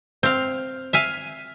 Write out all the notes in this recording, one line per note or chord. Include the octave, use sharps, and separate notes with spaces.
C4 F5
E5 F5 G#5